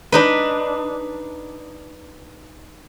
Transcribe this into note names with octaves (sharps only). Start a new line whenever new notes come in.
D4 D#4 B4